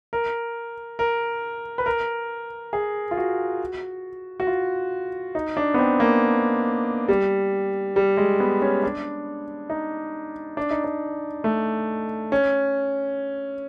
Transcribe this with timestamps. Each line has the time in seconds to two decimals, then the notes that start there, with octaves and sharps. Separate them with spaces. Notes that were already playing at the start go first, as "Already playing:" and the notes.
0.13 A#4
0.99 A#4
1.78 B4
1.86 A#4
2.73 G#4
3.11 F4
3.17 F#4
4.40 F#4
4.47 F4
5.35 D#4
5.57 D4
5.74 B3
5.79 C4
6.00 A#3
7.08 G3
7.96 G3
8.17 G#3
8.40 B3
8.62 C#4
8.83 D4
9.70 D#4
10.57 D4
10.71 D#4
10.84 D4
11.44 A3
12.32 C#4